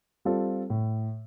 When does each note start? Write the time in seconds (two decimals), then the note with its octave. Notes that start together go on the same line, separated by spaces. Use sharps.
0.25 G3 C4 F4 A4
0.70 A2